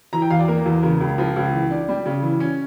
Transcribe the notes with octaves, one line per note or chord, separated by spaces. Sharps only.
E3 A#5
G5
E2 F5
D5
A#3 A#4
E2
C#3 A#4
C#2
F3
C#2
E3
D4
G3
C#3
E3
C#4